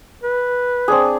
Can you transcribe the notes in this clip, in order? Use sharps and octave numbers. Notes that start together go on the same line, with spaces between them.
B4
C4 D4 G#4